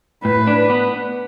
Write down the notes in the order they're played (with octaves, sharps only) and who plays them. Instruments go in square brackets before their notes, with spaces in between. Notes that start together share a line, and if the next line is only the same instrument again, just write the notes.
[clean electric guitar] A2 [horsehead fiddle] B4
[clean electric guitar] D4
B3